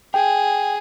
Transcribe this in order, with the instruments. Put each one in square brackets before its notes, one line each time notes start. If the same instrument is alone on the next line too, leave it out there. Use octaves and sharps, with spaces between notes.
[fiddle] G#4 [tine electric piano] G5